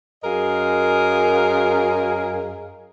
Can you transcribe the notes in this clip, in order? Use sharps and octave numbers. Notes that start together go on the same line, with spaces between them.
F#2 G#4 A#4 D#5 F5